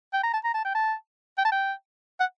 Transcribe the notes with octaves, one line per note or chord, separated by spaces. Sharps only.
G5
A#5
A5
A#5
A5
G5
A5
G5
A5
G5
F#5